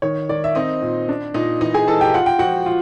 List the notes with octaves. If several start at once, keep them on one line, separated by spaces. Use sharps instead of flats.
D#3 C#5
D#3 D5
E5
C4 D#4 D#5
A#2
D4
A#2 D#4 D#5
E3 D#4 D#5
G#4 G#5
E3 A4 A5
G4 G5
F4 F#5
G5
F3 F#4 F#5
F4